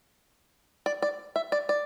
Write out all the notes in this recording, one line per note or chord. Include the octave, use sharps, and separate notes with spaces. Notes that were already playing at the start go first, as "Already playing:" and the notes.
D5
D5
E5
D5
D5